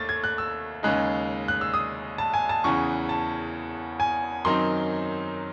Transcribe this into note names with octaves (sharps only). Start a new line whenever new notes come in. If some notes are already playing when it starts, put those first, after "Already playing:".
Already playing: D#2 D#3 A3 A6
G#6
F#6
E6
D#2 C#3 G#3 D#4 F#6
F#6
E6
D#6
A5
G#5
A5
E2 C#3 E3 C#6
A5
G#5
F#2 D#3 F#3 C4 D#4 C6